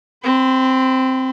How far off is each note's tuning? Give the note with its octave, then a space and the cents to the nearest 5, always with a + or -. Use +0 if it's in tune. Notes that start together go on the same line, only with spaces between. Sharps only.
C4 +0 B5 +40